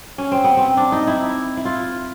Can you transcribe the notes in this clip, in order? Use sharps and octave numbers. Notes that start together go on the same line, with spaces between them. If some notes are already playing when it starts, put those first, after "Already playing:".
C#4
C4
B3
C4
D4
D#4
E4
E4
F4